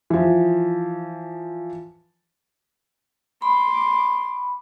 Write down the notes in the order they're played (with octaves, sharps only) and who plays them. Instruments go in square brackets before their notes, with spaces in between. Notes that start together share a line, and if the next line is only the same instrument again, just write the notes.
[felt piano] E3 F3
[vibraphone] B5 [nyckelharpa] C6 D6